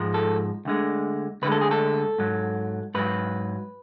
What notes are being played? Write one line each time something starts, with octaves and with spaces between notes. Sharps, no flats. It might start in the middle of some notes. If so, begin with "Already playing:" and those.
Already playing: G#2 F3 G#3
A4
D2 D3 G#3
D2 D3 G#3 B4
A4
G#4
A4
G#2 F#3
G#2 F#3 B4